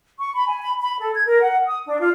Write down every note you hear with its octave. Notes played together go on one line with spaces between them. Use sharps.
C#6
B5
G#5
B5
B5
A4
G#6
A#4
F#5
D#6
D4
F4